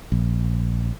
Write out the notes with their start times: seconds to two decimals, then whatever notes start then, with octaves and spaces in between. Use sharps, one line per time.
0.12 A#1